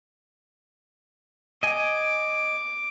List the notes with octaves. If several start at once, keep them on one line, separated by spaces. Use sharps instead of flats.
D#5 G#5 D6